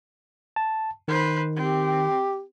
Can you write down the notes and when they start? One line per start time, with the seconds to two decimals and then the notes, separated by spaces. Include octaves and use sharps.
0.56 A5
1.08 D#3 B4 C5
1.56 C4 G4